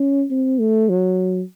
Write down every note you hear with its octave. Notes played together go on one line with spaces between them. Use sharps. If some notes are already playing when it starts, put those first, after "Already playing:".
Already playing: C#4
C4
A3
F#3